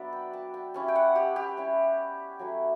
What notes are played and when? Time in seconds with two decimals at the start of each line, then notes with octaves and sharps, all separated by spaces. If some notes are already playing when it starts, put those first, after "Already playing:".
Already playing: F#3 B3 D4 D5 E5
0.13 G5
0.33 A5
0.54 G5
0.74 G3 C#4 E4 A5
0.88 G5
0.95 F#5
1.15 G4
1.36 G4
1.57 G3 C#4 E4
2.39 F#3 A3 C#4 E4